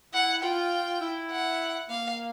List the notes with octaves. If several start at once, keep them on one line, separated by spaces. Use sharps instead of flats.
E4 F#5
F4 G5
E4
F#5
A#3 F5